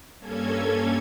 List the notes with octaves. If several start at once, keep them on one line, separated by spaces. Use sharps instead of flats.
G2 A#3 C#4 A4 G#6